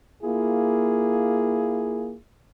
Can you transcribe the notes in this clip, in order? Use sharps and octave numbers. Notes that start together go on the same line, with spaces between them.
A#3 E4 F4 G#4